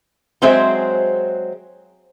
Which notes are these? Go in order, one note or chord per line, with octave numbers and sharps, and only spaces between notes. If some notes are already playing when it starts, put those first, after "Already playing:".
F#3 G#3 C4 G#4 C5 E5